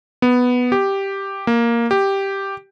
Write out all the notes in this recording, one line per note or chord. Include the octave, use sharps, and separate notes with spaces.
B3
G4
A#3
G4